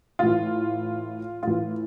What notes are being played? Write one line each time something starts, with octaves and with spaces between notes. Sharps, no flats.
A2 E3 F4
A2 E3 F4